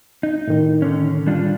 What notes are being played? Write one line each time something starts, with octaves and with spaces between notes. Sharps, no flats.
D#4
A2 D#3
D3 C#4
G3 D4 F4